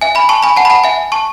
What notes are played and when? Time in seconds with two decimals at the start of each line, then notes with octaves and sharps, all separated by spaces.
0.01 E5 G#5
0.15 G#5 B5
0.29 A5 C#6
0.43 G#5 B5
0.57 F#5 A5
0.65 B5
0.70 F#5 A5
0.84 E5 G#5
1.12 A5 C#6